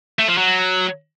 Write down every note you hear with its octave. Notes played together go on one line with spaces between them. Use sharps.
A3
F3
F#3